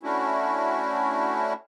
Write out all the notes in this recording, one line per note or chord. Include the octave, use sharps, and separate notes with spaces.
A3 C#4 D4 E4 F#4